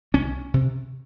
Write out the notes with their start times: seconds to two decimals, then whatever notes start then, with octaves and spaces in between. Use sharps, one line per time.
0.14 C2 C#4
0.54 C3